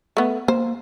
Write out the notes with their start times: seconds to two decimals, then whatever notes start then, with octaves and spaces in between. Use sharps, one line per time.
0.17 A3 B3
0.48 A#3 C5